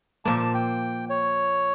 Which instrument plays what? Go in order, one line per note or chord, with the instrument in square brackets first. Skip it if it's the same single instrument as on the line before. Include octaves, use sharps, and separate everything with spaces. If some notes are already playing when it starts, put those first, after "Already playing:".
[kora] A#2 F3 A#3 [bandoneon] A5
[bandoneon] A5
G5
C#5